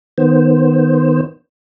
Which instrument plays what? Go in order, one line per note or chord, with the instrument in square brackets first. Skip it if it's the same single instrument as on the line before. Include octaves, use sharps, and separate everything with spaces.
[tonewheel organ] D#3 B3 C5